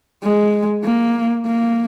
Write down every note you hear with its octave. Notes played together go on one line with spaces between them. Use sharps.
G#3
A#3
A#3